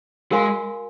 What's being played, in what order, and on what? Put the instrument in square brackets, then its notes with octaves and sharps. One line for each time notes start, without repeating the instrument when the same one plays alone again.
[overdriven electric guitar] G#3 [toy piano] F#4 A#4 F5 G#5 C6